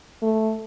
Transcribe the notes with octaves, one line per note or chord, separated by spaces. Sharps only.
A3